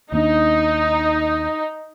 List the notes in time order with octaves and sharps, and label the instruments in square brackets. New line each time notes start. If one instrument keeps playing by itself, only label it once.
[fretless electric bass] D#2 D#3 A#3 D4 [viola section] D#4